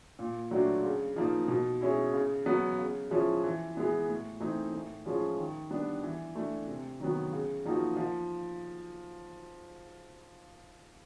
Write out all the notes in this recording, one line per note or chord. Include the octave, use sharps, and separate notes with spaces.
A#2
F#3 A3 D4 F#4
C#3
F3 A#3 D#4
B2
G#3 C#4 E4
C#3
F#3 B3
C#3
F3 G#3 C#4 E4
E3
G#3 B3 E4
A2
E3 A3 C4 D#4
A2
F3 G#3 C#4 F4
D#3
G3 B3 D4
E3
A3 D4
C3
D#3 F#3 B3
C#3
F3 A#3 D#4 F#4
F3